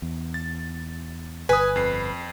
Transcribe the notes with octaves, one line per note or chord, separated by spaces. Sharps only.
E2
A6
G1 B4 G#5 D#6
F2 C7